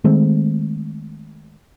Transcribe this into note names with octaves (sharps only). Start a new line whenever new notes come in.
D#3 G#3 A3 C4